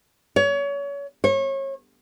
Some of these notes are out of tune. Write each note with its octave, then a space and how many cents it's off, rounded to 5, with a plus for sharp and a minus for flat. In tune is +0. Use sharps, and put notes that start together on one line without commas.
C#5 +30
C#5 -30